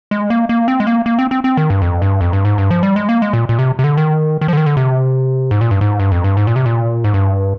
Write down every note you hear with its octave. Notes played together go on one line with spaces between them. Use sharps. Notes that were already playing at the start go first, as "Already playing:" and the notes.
G#3
A#3
A#3
C4
G#3
A#3
A#3
C4
C4
C4
D#3
G2
F2
G2
F2
G2
G#2
G2
F3
G3
G#3
A#3
G#3
A#2
A#2
C3
C3
D3
D#3
D#3
F3
D3
D#3
D3
C3
G#2
A#2
G2
G#2
G2
F2
G2
G#2
A#2
C3
A#2
G#2
G2